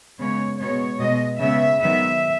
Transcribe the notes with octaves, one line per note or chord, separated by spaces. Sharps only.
C#3 G#3 B3 C#5
B2 G#3 B3 C#5
B2 G#3 B3 D#5
C#3 G#3 B3 E5
D#3 F#3 B3 E5